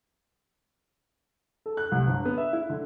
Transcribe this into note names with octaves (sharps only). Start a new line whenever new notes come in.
A4
F#6
C2
G1
B3
E5
E4
D3